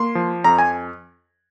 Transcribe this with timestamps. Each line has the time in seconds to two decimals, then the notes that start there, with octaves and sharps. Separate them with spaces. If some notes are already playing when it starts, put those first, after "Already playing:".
Already playing: A#3 C6
0.15 F3
0.44 F2 A#5
0.59 G#5